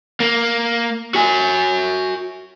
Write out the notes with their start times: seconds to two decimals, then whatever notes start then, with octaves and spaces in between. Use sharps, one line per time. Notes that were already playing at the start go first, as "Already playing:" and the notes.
0.20 A#3
1.14 F#4 G#5